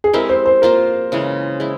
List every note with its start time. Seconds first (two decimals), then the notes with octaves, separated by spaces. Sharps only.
0.04 G#4
0.13 G#3 C4 E4 G4 A#4
0.29 C5
0.46 C5
0.62 A#3 F4 A#4 C5
1.12 C#3 E3 G#3
1.60 G#3 E4